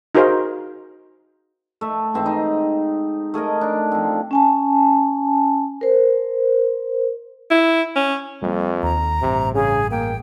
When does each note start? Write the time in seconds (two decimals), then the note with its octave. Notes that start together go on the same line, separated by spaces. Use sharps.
0.15 D#4 F#4 G#4 A#4 C5 F5
1.81 A3 E5
2.14 G#2 E3 C4 E5
2.26 D#4
3.34 A3 G#4 A#4 D#5
3.61 D4 D#4
3.92 F3 C4
4.31 C#4 G#5 A5
5.81 A#4 C5
7.51 E4
7.96 C#4
8.42 F2 G3 A#3
8.83 D#2 A#5
9.22 A1 G2 C3
9.55 C#3 G#4
9.91 A#3 G5